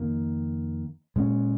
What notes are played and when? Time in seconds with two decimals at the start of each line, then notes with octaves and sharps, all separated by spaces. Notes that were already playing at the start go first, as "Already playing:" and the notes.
Already playing: F2 D#3 A#3
1.16 A#2 G#3 C#4